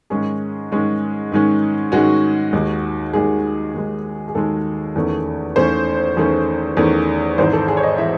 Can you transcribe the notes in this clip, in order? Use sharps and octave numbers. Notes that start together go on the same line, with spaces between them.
G#2 D#3 G#3 C#4 G#4
G#2 D#3 G#3 C#4
G#2 D#3 G#3 C#4
G#2 D#3 G#3 C#4 F#4
D#2 D#3 G#3
D#2 D#3 G#3 G#4
D#2 D#3 G#3
G#4
D#2 D#3 G#3 A4
E2 D#3 A3 C#4
E2 D#3 A3 C#4 C5
E2 D#3 A3 C#4
E2 D#3 A3 C#4
G#1 G#2 E3 C5
A4
G#4
C#5
D#5
E3 E5